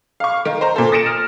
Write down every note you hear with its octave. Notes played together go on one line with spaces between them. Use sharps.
F5 C#6
D#3
C5 A#5
A#2 A4
D#6 A6 A#6 C#7 D7 E7
F6